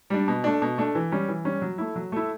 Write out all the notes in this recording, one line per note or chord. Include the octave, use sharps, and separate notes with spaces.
G3 D4
B2
A3 D4
B2
A3 D4
E3
G3 C#4
E3
G3 C#4
F#3
A3 E4
F#3
A3 E4